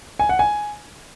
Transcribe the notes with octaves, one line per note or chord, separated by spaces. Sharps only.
G#5
F#5
G#5